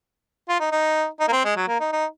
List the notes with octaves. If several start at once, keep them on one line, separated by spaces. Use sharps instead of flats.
F4
D#4
D#4
D#4
A#3
C4
G#3
F#3
A#3
D#4
D#4